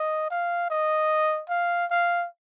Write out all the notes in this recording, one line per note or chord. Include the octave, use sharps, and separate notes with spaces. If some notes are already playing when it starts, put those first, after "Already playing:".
Already playing: D#5
F5
D#5
F5
F5